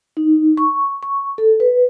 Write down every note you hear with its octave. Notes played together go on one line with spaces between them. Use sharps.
D#4
C#6
C#6
A4
B4